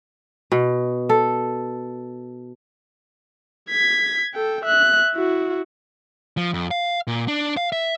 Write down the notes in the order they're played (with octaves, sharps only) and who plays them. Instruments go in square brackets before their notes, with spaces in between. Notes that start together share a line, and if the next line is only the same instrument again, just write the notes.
[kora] B2
A4
[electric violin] G#6 B6
A4 G5
E5 F#6
E4 F#4
[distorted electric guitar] F3
F2
F5
A#2
D4
F5
E5